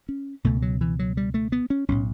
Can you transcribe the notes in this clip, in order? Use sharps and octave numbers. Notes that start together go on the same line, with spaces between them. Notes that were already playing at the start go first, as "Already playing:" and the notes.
C#4
C#2 B2 A3
F#3
E3
F#3
G3
A3
B3
C#4
B1 A2 C#4